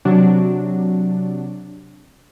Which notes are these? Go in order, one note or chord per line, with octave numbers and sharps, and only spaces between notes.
C3 F#3 D4 F#4